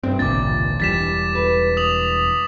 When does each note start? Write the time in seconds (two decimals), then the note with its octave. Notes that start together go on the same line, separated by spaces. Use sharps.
0.03 G2 C3 C4 D4
0.19 G#1 C#2 A#2 D6 A6
0.80 E1 E3 G3 A6 B6 E7
1.35 B4
1.77 D#6 F7 F#7